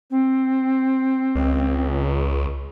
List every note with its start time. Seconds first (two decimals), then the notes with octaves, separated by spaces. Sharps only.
0.10 C4
1.35 C#2